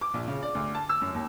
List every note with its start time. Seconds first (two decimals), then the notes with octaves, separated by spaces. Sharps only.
0.01 D6
0.14 A#1
0.28 C#3
0.42 D5
0.55 D2
0.75 A5
0.89 E6
1.01 F#2
1.14 D#2